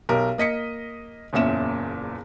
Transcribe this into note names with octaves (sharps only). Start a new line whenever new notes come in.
B1 G4 A#4
A#3 D#5 B6 C#7
F#1 E2 A#2 C#4 E5 E7